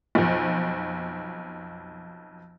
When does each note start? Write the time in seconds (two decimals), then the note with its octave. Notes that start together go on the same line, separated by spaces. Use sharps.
0.15 B1 F2